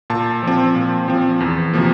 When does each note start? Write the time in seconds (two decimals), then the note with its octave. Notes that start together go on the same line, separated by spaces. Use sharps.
0.10 A#2 A5
0.43 F3 C4
0.76 A#2
1.08 F3 C4
1.40 E2
1.73 C3 F3 A#3